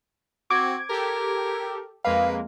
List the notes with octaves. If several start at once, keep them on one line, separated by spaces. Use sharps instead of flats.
C4 F#4 D6 G#6
G4 A4 A#4
F2 G#3 A#3 B4 F5